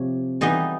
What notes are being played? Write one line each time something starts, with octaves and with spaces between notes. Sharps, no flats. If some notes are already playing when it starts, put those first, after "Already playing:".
Already playing: C3 F3 C#5
E3 G3 B3 D#4 D#5